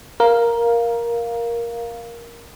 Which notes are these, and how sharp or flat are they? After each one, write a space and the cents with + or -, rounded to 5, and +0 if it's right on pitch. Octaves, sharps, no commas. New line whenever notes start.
A#4 +10 F5 +0